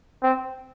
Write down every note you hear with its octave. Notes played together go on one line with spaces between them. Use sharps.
C4